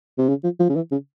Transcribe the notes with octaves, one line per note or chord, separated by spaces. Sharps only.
C3
C#3
F3
F3
C#3
E3
C#3